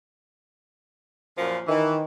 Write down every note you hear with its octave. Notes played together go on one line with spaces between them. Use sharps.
F#2 A#2 F3
D#3 E3